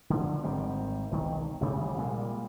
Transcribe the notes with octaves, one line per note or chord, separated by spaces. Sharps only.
D3
G#1 D#3 G3 C4
E1 C2 D#3
A1 C3 G3
A#2 G3 G#3 A#3